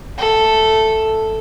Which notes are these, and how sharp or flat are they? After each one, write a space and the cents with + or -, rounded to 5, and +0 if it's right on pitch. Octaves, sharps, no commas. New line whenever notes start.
A3 +0 A4 +0